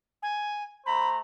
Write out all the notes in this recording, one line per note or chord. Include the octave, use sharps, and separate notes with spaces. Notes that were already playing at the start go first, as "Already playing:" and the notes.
G#5
A3 C5 A#5 B5